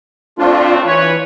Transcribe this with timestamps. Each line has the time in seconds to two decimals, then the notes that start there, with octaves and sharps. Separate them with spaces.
0.39 A3 C4 D4 F4
0.84 E3 B4 C#5